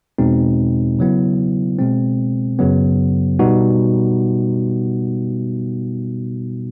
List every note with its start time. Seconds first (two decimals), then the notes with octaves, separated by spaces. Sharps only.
0.19 E2 B2 G#3 C4 D#4
0.99 C#3 F#3 B3 E4
1.78 B2 G#3 C4
2.59 F#2 C#3 F#3 B3
3.39 B2 G3 B3 D#4 F#4